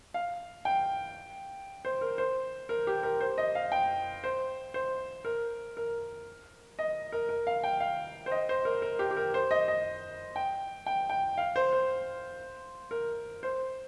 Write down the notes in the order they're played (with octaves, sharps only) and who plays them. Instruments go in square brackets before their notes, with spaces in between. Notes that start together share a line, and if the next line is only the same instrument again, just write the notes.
[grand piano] F5
G5
C5
A#4
C5
A#4
G4
A#4
C5
D#5
F5
G5
C5
C5
A#4
A#4
D#5
A#4
A#4
F5
G5
F5
C5
D#5
C5
A#4
A#4
G4
G4
A#4
C5
D#5
D#5
G5
G5
G5
F5
C5
C5
A#4
C5